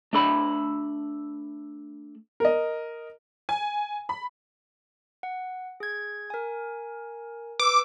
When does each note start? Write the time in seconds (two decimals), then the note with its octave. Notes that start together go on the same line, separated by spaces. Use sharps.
0.13 A3 D4 A4 B5
2.40 A#4 D#5
3.49 G#5
4.09 B5
5.23 F#5
5.80 G#4 G#6
6.30 A#4 G#5
7.60 B4 D6 E6